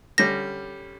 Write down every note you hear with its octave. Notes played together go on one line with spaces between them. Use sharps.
D3 G3 C#4 A#6